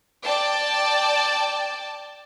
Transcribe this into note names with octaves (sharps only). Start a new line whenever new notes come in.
D5 G5 A5